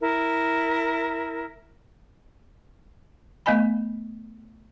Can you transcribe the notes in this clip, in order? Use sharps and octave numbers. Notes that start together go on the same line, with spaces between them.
E4 A#4
A3 B3 D#5 G#5 B5